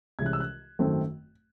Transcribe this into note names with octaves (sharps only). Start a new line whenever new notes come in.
C2 C3 E3 G#3 C#4 G#6
F#6
E6
F#6
G#1 F#2 D#3 A3 C4